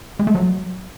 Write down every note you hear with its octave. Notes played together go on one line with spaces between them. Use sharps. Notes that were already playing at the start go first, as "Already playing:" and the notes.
G#3
A3
F#3